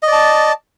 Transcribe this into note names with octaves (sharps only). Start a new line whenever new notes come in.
D5 D#5 A5